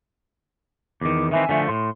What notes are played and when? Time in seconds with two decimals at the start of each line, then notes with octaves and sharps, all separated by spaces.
1.01 E2 D#3 D6
1.31 D#3 E3 C4 E5 G#5
1.49 D3 F3 A3
1.69 A2 C6